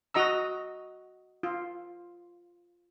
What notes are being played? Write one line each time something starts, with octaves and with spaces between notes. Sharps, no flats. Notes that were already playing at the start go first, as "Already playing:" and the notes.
F#4 D#5 A#5 E6
F4